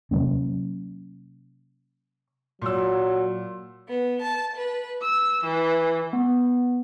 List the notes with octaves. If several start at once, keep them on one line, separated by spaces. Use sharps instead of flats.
C3 F#3 A#3 C#4
A#2 F#3 E6
B3
A5
B4
E6
E3
B3